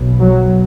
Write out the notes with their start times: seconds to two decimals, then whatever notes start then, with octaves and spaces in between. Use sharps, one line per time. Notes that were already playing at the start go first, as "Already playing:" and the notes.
Already playing: B1 B2
0.20 F#3